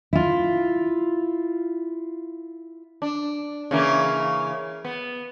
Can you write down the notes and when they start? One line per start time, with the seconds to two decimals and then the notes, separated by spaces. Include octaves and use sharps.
0.13 E4 F4
3.02 D4
3.71 C#3 E3 A#3
4.85 B3